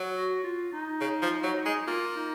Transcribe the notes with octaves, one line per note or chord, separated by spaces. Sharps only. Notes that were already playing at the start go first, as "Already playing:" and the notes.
Already playing: F#3
F#4
F4
D#4
C#3
F3
F#3
G#3
A#3 F4
D#4